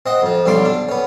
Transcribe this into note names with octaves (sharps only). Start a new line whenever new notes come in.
C4 D#5 F#5
F2 F3
B1 D3 G3 C#4 C6 D6
D4
B3 C#4